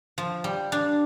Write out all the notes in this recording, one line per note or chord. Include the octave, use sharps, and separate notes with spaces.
F3
G3
D4